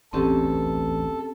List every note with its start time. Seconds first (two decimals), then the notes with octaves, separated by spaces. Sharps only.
0.13 D1 A1 E2 C4 C#4 G4 A4